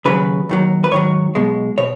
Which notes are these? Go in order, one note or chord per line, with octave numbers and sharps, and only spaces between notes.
D#2 C#3 F#3 B4
D#2 D#3 F#3
B4
G#2 D#3 F#3 C#5
B1 B2 G#3
B2 C#5